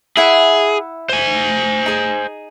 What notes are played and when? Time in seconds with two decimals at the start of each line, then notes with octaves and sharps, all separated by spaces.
0.17 E4 G#4 E5 F#5
1.09 C5 G#5
1.86 D#4 G#4